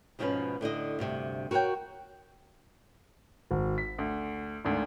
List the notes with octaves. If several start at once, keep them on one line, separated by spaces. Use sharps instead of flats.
G#2 B2 F3 A#3 C#4 B4
A2 D3 D5 D#5
D2 G2 C3
F#4 A#4 B4 C#5 G5
G#1
B6
D2
G#1 D2